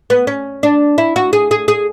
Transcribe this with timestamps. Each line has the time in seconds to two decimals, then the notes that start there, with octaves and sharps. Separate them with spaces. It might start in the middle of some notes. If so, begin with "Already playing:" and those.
0.10 B3
0.27 C#4
0.63 D4
0.98 E4
1.16 F#4
1.33 G#4
1.51 G#4
1.68 G#4